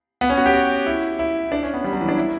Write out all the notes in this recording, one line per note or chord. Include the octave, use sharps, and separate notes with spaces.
B3
C#4
F#4
G4
F#4
E4
E4
D4
C#4
B3
G3
F#3
E3
D4
E4